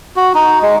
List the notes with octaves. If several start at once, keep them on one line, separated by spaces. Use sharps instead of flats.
F#4
D#4
G#3